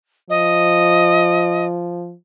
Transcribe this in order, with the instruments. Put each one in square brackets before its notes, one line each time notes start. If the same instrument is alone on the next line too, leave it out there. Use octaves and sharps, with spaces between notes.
[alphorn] F3 [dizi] D#5